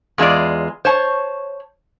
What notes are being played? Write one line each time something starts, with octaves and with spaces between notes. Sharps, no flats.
E2 G#3 F4 G#4 D5
C5 C#5 A5